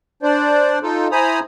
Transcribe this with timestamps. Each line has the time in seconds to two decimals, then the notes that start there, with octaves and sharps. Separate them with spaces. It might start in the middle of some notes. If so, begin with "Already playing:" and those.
0.23 D4 C5 D5
0.83 D#4 F4 A4
1.12 E4 C5 G#5 A#5 B5 D#6